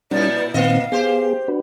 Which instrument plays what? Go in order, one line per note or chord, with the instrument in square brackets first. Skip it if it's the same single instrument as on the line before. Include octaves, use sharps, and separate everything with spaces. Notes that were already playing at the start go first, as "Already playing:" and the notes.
[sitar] A#2 E4 [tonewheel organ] G3 C#4 D#4 [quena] D5
[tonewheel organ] B4
[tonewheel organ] A#2 D#3 C4 [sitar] A#3 D#5 [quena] F5
[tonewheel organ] B3 G#4 [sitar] G4 C5
[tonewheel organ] D4 F#4 B4